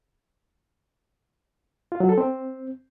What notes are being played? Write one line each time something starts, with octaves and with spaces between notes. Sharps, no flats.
F4
F#3
A4
C4